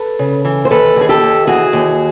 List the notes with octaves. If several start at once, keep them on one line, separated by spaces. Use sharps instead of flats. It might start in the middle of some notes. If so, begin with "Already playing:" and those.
Already playing: A4 B4
C#3
E3
C5
D#2 A4 B4
D#2
G#4
G4 A4
D#2
E3 F#4 G#4
D#2